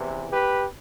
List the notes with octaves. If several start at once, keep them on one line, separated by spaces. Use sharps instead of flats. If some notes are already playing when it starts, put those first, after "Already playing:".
Already playing: E2 C3 E3
G4 B4